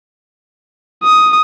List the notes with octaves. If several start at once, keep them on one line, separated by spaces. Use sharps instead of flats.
D#6